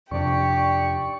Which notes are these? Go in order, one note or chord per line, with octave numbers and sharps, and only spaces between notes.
F2 C3 D4 G4 D5 C#6